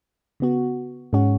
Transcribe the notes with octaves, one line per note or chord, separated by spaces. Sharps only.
C#3 B3 F#4
G#2 G#3 C#4 F#4